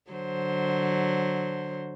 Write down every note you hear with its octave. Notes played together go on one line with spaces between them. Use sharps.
D3 F#3 C5